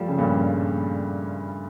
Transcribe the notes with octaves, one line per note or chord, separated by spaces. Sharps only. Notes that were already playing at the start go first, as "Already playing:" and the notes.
Already playing: F3 G3 A3
C#3
G2 A#2